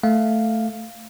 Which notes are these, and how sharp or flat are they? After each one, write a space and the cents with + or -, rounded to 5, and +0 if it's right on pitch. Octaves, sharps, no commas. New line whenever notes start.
A3 +0 F5 +0